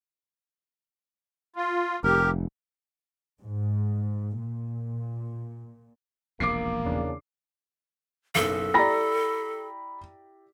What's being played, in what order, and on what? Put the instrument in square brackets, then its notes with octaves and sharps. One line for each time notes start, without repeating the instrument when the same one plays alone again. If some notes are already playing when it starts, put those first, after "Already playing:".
[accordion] F4
[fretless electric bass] F1 [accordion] G4 [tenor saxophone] A#4
[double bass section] G#2
A#2
[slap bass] E1 A#1 D#2 [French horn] A#3 [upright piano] D6 C7
[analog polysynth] E2 C#3 D4
[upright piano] F#1 B1 [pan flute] A4
[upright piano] E4 G4 D5 [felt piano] A#5 B5 A#6